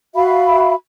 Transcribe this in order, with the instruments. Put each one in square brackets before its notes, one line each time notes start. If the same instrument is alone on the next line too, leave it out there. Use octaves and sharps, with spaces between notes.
[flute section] F#4 E5 F5 B5